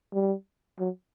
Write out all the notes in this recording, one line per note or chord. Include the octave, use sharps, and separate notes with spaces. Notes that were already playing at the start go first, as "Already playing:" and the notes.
G3
F#3